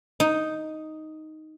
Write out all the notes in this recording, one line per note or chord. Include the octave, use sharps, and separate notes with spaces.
D#4